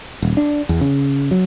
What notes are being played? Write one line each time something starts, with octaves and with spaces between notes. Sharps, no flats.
D#1
D4
E2
C#3
F#3